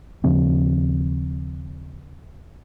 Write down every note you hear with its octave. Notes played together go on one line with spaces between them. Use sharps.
D#2 C#3 F3 C4